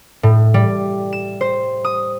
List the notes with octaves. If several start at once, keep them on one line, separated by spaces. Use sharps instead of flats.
A2
G3
E7
C5
D#6